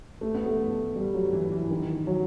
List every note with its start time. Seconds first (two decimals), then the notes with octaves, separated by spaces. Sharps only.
0.21 A3
0.35 B3
0.46 A3
0.96 G3
1.14 F#3
1.33 E3
1.52 E3
1.70 D#3
2.07 F#3